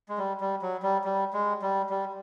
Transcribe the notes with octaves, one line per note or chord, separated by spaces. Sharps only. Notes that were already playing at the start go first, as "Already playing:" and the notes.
G#3
G3
G3
F#3
G3
G3
G#3
G3
G3